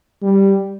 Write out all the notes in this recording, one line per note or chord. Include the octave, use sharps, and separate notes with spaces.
G3